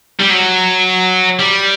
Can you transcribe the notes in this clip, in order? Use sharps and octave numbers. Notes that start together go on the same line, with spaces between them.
G3
F#3
G3